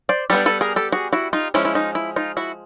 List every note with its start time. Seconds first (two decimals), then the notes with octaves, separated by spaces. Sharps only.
0.09 C5 D5
0.30 G3 B3 D4 G4 A4
0.46 A4 B4
0.61 G#4 A#4
0.76 G4 A4
0.92 F#4 G#4
1.13 E4 F#4
1.33 D#4 F4
1.54 F3 G#3 C#4 E4
1.65 E4
1.75 D#4
1.95 E4
2.16 D#4 F4
2.37 E4 F#4